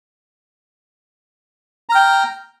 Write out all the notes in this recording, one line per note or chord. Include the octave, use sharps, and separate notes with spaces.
G5 A#5 F6